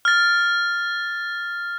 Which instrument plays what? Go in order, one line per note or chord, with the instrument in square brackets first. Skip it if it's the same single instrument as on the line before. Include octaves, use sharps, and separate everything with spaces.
[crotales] F6 A6